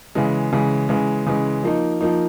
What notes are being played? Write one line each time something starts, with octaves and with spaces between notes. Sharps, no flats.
C#3 E3 G#3
C#3 E3 G#3
C#3 E3 G#3
C#3 E3 G#3
F3 A#3 D#4
F3 A#3 D#4